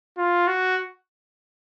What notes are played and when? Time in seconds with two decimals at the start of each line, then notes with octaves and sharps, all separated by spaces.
0.18 F4
0.47 F#4